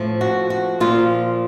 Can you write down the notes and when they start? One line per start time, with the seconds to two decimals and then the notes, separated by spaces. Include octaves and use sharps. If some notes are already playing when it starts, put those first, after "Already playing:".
Already playing: A2 F3
0.21 F#4
0.50 F#4
0.80 A#2 F3 F4